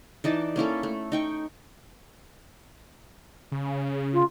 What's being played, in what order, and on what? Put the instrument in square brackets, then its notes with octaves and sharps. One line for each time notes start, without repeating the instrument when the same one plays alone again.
[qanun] E3 D#4 D5 A5
A#3 C#4 E4 A4
A3
D#4 G5 C#6
[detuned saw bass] C#3
[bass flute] F4